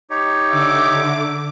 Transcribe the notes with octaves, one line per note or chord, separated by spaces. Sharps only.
D#4 G4 C#5
D3 E5 D6